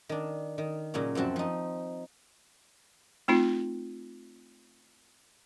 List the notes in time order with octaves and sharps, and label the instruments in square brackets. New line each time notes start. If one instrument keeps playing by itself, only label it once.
[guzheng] D#3 D4
D#3
A#2 C#3 F#3 C#4
F#2 F3 C4 F#4 A5
F3 D#4
[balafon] A3 C4 D#4 F4